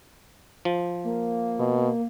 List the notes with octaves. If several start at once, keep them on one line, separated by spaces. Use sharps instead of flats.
F3
A#3
B2